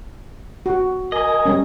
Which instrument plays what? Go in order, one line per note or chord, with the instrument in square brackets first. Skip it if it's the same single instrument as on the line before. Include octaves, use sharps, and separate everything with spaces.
[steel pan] F#4
[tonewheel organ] A#4 G#5 [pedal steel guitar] D#5
[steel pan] G3 C#4